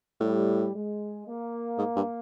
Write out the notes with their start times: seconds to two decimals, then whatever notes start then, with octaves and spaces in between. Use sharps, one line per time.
0.20 A2 G3
0.74 G#3
1.26 A#3
1.78 G#2
1.96 G2